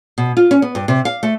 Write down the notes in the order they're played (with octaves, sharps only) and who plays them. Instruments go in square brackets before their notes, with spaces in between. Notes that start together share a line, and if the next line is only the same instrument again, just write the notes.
[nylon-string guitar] B2
F4
C#4
B3
G2
C3
F5
A3